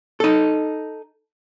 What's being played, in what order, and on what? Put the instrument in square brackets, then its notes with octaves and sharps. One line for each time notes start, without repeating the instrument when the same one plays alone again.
[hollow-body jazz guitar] D#4 A4